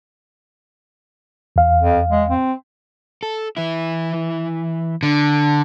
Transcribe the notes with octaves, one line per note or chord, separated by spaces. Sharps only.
E2 F5
F2
G#3
C4
A4
E3 E4
D3